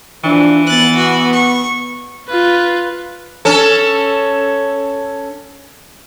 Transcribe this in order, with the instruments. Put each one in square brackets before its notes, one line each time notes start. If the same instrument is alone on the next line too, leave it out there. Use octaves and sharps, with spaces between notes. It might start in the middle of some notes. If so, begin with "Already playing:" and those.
[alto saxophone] E3 [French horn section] F3 D4
[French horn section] B3 [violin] F#6 A6
[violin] F#4
C#6
[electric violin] F4 B4
[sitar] C#4 A4